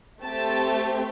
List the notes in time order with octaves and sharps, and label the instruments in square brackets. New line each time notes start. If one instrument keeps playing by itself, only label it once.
[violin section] A3 C4 G4 A5